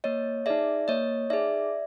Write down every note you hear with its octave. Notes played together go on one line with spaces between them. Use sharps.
A#3 C#5 D#5
D#4 G#4 D5 E5
A#3 C#5 D#5
D#4 G#4 D5 E5